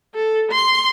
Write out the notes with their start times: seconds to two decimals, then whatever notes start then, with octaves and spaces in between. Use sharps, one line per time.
0.15 A4
0.51 C6